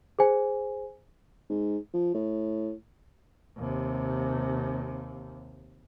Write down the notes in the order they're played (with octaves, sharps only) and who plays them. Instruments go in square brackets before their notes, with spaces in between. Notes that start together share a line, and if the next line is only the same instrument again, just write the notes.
[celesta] G#4 C5 G#5
[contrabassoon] G#2
F3
A2
[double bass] D#2 C3